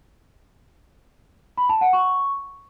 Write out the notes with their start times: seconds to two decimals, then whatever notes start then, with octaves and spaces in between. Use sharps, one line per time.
1.58 B5
1.69 A5
1.81 F#5
1.93 C#6